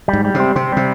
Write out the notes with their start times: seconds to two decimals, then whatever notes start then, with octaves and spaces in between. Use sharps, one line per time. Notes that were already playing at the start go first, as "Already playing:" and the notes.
0.08 G3
0.13 G#2
0.25 G3
0.34 C3
0.40 C4
0.56 C3 C4
0.72 C3 G3